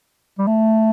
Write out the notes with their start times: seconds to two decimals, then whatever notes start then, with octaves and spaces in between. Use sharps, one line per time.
0.38 G3
0.47 A3